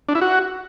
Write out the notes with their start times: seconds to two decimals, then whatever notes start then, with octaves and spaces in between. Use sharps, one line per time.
0.09 D4
0.15 E4
0.21 F#4